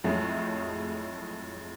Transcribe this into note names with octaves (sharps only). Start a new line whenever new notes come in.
F2 A2 F#3 G#3 A3